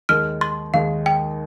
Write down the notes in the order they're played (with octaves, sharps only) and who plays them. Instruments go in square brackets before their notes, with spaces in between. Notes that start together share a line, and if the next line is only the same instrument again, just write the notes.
[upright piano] D#2 D#3 G#3 [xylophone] F6
[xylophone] C6
[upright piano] D#2 D#3 G#3 [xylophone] F5
[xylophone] G5